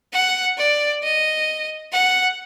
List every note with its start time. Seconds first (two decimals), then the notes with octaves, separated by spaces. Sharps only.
0.13 F#5
0.58 D5
1.03 D#5
1.92 F#5